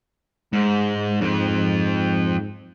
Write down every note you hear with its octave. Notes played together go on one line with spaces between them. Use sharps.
G#2 G#3
F2 G#2